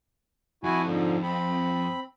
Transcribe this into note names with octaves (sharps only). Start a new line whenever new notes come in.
F2 E4 F#4 G#5
G#2 D3 F3
C4 B5